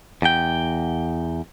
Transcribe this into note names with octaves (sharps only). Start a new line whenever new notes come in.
E2 G5